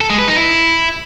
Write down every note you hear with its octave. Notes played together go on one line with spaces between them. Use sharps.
A4
G#3
B4
D#4
E4